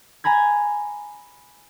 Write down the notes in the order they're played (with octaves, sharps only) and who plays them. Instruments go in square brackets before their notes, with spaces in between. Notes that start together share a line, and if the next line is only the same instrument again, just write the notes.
[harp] G#5 A#5 B5 G#6